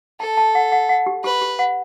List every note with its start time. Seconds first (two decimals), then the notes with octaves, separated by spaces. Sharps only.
0.20 A4 A5
0.37 A5
0.55 F#5
0.72 F#5
0.89 F#5
1.07 G4
1.24 G4 B4
1.42 G4
1.59 F#5